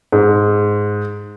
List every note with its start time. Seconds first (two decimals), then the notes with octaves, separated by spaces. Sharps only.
0.12 G#2